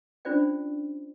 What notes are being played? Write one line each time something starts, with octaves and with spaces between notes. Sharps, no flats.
C#4 D4 F4 C5 D5 G5